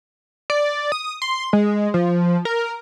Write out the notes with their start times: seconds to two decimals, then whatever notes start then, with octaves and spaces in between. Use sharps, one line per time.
0.50 D5
0.92 D#6
1.22 C6
1.53 G#3
1.94 F3
2.45 A#4